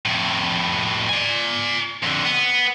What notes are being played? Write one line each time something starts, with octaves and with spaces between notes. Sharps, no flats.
F2 A2
D5 G#5
F2 D3
B3